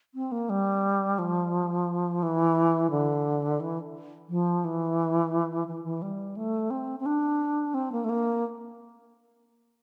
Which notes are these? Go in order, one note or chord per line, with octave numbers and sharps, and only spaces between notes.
C4
A#3
G3
F3
E3
D3
E3
F3
E3
E3
E3
G3
A3
C4
C4
D4
C4
A#3
A3
A#3